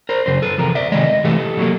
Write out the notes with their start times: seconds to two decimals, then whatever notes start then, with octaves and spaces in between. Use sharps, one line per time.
0.09 A#4 C5
0.26 F#2 C#3 C5
0.42 A4 B4
0.58 E2 C3 F3 A#4
0.75 D5 E5
0.92 C3 D#3 G#3 D#5
1.24 C3 E3 A3 G4 A4
1.57 B2 F#3 A#3